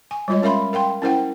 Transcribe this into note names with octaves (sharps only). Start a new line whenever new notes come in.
G#5
G3 G#3 F4 C#5 D#5
C#4 A#4 E5 F5 B5 C6
A#4 F5 G5 C6
C#4 E4 A#4 C5 F#5 G5